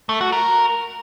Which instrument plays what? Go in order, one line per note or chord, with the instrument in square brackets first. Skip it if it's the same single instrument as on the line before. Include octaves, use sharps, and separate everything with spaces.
[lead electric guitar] A3
F#4
A#4